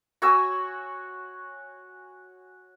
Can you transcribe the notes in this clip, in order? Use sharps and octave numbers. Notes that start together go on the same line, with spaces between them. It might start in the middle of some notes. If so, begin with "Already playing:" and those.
F#4 C#5 G#5 E6